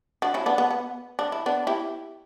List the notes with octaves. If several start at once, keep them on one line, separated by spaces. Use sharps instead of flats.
D4 F#4
C#4 E4
B3 D4
B3
B3
D4
E4
B3 D4
E4 G4